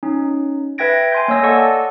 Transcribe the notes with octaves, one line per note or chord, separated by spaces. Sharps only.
C#4 D#4
B4 E5 G5 G#6 A#6 D7
G#5 C6 G6
A#3 C#5 D#5 E6 A#6
A4 D5 F#5 A5 C#6 E6